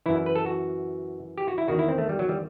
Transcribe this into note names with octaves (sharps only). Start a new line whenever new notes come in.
F#2 E3 E4
B4
A4
F#4
G4
F#4
E4
E2 D#3 F#4
E4
C4
A3
G3
F#3
G3